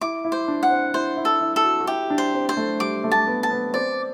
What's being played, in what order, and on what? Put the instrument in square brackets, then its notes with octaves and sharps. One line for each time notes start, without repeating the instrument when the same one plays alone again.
[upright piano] E4 [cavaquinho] D6
[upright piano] E4
[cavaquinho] C5
[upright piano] D4
[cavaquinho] F#5
[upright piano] C4
[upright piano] E4 [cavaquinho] C5
[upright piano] E4
[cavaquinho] A4
[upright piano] E4
[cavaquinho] A4
[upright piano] F#4
F#4
[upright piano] E4 [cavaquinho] G4
[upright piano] D4
[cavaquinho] C5
[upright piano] C4
[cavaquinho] C5
[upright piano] A3
[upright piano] G3 [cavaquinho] D6
[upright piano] A3
[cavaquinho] A5
[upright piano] B3
[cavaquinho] A5
[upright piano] B3
[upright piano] C4 [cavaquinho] D5